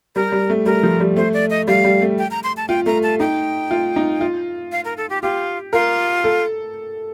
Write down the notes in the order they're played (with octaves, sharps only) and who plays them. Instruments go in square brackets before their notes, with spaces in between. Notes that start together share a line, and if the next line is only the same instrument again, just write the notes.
[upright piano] G3 [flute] A#4
[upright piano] G3
A3
[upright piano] G3 [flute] A#4
[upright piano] F3
G3
[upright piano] A3 [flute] C5
[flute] D5
D#5
[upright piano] G3 [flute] F5
[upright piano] G3
A3
[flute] G5
A#5
C6
A5
[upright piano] F4 [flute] G5
[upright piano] A3 [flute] A#5
[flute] A5
[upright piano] D#4 [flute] G5
[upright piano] F4
D#4
F4
[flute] F5
A#4
A4
G4
[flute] F4 [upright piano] G4
[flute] F4 [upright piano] A#4
[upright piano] A4